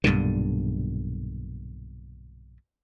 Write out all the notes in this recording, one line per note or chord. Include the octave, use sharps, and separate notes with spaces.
B1 G2 A#2 D3